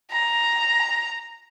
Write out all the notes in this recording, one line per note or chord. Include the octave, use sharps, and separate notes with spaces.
A#5